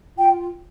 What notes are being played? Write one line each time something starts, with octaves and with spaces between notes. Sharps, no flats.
F4 G5